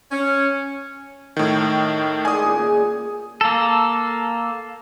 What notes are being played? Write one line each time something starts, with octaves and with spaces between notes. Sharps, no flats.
C#4
A2 D#3
G#3 D5 F#5 G#5 D#6
A#2 C#3
A#3 A4